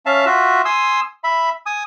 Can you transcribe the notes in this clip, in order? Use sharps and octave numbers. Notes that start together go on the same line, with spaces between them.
C#4 E5 F5 A5
F4 F#4 E5
G#5 C6 D#6 E6
E5 B5
G#5 D#6